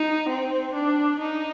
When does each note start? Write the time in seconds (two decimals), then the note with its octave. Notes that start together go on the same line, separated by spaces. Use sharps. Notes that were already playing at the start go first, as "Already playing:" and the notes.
Already playing: D#4
0.29 C4
0.73 D4
1.19 D#4